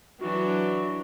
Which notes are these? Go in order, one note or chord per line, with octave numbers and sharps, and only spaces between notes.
E3 F#3 D4 F#4